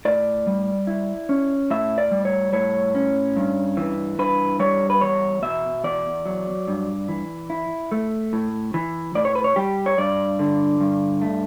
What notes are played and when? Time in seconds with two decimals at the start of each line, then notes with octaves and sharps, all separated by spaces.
0.05 A2 D5
0.47 G3
0.87 E4
1.29 C#4
1.70 A2 E5
1.98 D5
2.11 G3
2.25 C#5
2.53 A2 C#5
2.95 C#4
3.36 G2
3.77 E3
4.19 G2 B4
4.59 G3 C#5
4.90 B4
5.01 E2 C#5
5.42 B2 E5
5.84 E2 D5
6.26 F#3
6.67 G2
7.08 E3
7.50 E4
7.92 A3
8.33 A2
8.74 E3
9.15 A2 D5
9.25 C#5
9.35 B4
9.44 C#5
9.56 G3 G4
9.86 C#5
9.98 G2 D5
10.39 D3
10.80 G2
11.22 A3